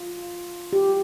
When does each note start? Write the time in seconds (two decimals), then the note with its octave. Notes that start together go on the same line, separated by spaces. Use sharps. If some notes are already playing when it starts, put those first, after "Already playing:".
Already playing: F4
0.73 G4